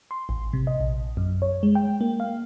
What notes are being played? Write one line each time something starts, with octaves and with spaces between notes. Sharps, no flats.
C6
A1
C3
D#5
A#1
F#2
C#5
G#3
G5
A#3
F5